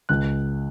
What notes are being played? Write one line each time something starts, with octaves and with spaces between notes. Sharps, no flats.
C#2 F#6